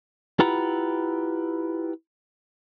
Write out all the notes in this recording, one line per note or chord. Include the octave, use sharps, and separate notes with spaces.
E4 F4 G4 B4 F#5 A#5